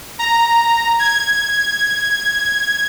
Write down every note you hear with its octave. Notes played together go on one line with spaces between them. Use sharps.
A#5
G#6